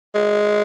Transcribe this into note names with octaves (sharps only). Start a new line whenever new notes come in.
G#3